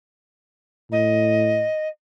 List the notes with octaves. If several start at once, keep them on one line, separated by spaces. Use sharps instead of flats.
A2 D#5